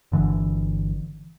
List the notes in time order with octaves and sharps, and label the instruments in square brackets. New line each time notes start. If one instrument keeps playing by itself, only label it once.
[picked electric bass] G1 D3 E3